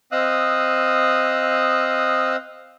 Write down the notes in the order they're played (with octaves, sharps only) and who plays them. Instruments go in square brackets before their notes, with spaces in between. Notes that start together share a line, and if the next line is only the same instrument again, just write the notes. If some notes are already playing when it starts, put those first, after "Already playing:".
[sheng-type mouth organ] C4 D#5 F5 D#6 E6 F#6